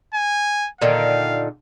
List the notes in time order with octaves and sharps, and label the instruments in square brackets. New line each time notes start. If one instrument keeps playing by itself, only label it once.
[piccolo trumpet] G#5
[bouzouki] A#2 D3 D#3 [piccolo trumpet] F5